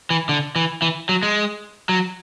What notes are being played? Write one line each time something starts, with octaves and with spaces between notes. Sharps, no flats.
E3
D3
E3
E3
F#3
G#3
F#3